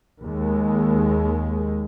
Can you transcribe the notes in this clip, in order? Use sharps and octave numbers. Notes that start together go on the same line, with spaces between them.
D#2 G#3